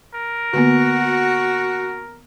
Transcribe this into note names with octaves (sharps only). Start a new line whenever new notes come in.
A#4
D3 A#3 B3 F#4